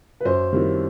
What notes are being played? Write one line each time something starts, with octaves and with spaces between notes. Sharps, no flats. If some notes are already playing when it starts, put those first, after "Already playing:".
B4
F#2 C5
D#3 G3 C4 E4